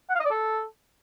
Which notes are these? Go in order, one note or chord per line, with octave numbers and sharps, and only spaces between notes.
F#5
F5
D#5
D5
A4